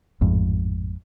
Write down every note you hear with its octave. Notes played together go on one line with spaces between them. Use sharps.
A1 F2 G#2